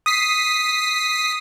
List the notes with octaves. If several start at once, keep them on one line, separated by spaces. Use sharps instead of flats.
D#6 B6 C7